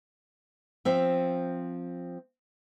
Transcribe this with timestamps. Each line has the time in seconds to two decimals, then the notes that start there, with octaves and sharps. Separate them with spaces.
0.85 F3 C4 E5